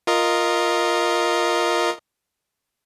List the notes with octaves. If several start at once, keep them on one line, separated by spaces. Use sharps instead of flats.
F4 A#4 D#5